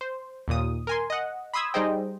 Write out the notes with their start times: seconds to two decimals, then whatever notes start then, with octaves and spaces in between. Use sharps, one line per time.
0.01 C5
0.48 D#2 A#2 D#6
0.87 A#4 G#5 C6
1.10 D#5 F#5
1.53 B5 C6 D#6 E6 G#6
1.74 G3 D#4 G#4 C5 D#5 G5